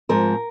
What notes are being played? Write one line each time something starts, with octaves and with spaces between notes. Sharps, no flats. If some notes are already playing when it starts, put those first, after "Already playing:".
G#2 F3 C4 A#4